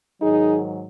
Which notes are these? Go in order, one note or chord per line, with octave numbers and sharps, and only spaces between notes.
G#2 D#3 F#3 D#4 G#4